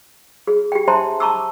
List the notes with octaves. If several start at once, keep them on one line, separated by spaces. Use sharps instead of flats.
G#4
G4 G5
D4 C5 E5 A5 A#5 C6
A5 A#5 C#6 D6 E6